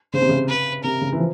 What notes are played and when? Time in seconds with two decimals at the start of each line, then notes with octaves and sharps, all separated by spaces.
0.13 C#3 C5
0.22 C3
0.29 C#3
0.48 B4
0.83 C3 A#4
1.01 C#3
1.12 E3
1.18 F3